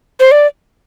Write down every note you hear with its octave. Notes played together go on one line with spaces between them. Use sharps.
C5
D5